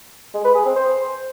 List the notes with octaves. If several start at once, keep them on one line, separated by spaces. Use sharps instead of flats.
G#3
B4
G#4
C4
C5